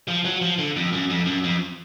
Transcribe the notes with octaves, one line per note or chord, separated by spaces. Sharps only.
F3
F#3
F3
D3
F2
F#2
F2
F#2
F2